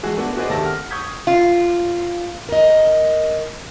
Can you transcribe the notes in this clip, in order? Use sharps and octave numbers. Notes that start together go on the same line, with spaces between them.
E3 G#3 A3 F#4 G#4
A3 B3 D4 F#4 B4 F#5
F#4 G#4 B4 C5 D5 D#5
D2 C3 D#3 E5 A5 A#6
F#5 F6
C#6 D#6 G6 G#6 B6
F4
A#4 D#5